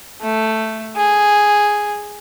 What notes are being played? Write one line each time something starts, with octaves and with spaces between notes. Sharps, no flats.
A3
G#4